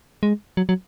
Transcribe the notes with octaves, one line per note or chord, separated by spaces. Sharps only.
G#3
F#3
F#3